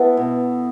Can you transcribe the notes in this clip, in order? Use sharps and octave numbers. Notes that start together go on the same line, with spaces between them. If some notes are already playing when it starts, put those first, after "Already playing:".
Already playing: B3 E4 A4
B2